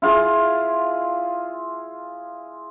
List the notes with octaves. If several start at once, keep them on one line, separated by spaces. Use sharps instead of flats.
E4 F4 G#4